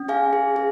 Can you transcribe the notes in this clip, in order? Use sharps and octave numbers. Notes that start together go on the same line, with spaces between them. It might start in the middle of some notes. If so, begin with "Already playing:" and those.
Already playing: C#4
G#4 F5 G#5
G#4
G#4